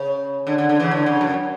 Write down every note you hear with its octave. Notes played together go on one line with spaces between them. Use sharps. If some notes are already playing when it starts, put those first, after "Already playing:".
Already playing: C#3
D3
D3
D3
C#3 E3
D3
C#3
F#2